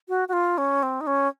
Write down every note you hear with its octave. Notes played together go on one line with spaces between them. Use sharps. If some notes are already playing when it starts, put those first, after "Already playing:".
F#4
F#4
F4
C#4
C4
D#4
C#4